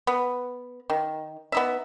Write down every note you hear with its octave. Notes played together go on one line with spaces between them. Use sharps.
B3
D#3
B3 D#4 E5